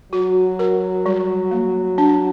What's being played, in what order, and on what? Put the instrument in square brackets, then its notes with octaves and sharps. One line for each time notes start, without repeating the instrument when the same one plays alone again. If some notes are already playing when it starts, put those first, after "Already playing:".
[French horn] F#3 [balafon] F#4
[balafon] A#4
G3
A#3
D4